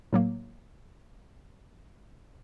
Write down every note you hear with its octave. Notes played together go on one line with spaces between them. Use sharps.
A2 F#3 A#3